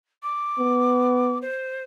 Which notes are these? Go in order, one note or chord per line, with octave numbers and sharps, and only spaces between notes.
D6
B3
C5